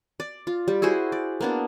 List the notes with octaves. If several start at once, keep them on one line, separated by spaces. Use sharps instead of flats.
D5
F4
G3
E4 F#4 G#4 C5
D5
A#3 B3 D4